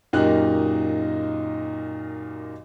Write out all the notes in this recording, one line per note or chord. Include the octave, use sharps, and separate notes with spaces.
F#2 A#2 D#4 G4 D#5 F#6